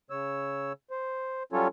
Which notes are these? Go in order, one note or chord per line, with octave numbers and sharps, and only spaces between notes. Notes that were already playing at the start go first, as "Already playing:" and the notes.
C#3 C#5 E6
C5
F#3 G3 C#4 F4 A4 C#5